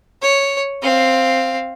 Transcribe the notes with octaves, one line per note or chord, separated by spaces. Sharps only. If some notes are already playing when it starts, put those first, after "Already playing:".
C#5
C4 F5